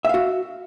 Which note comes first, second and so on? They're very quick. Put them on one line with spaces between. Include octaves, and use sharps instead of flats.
E5 F5 F#4